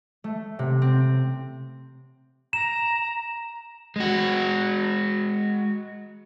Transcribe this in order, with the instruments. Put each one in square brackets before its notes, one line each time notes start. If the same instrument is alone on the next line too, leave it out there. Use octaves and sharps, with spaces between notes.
[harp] A3
C3
C4
[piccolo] A#5 [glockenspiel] E7
[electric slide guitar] G#3 F#4